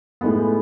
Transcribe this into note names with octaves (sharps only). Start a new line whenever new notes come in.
A2 G#3 B3